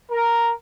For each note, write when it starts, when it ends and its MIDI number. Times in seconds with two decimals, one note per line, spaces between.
0.11 0.51 70